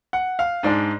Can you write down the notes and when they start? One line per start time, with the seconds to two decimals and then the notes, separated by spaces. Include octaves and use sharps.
0.13 F#5
0.39 F5
0.63 G#2 G#3 D4 D5